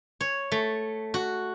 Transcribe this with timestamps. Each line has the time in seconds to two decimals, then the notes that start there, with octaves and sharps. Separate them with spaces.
0.21 C#5
0.52 A3
1.14 F#4